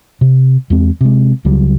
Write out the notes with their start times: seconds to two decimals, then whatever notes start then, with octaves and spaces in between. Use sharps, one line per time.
0.21 C3
0.70 E2 G#3 C4
1.01 C3 G#3
1.45 C#2 C#3 F#3 G3